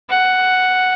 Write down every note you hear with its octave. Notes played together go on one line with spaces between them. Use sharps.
F#5